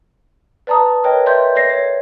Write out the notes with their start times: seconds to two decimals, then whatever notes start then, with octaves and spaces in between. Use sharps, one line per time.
0.67 B4 D5 A5 A#5 D#6
1.04 A#4 B4 C#5 D#5 G5
1.26 B4 D5 E5 C6 G6
1.55 A4 C#5 D5 A#6 C7
1.70 C#5